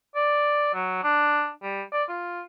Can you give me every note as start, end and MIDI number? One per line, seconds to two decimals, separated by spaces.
0.15 0.72 74
0.74 1.01 54
1.03 1.50 62
1.62 1.82 55
1.92 2.04 74
2.09 2.42 65